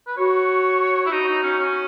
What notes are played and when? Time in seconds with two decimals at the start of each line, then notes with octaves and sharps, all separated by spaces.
0.07 B4
0.17 F#4 C#5
1.06 E4
1.11 D#4 F#4
1.27 D#4
1.43 C#4
1.58 C#4